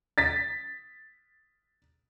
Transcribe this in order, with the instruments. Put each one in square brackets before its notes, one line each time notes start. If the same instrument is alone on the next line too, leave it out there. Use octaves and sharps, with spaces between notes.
[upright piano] A6 B6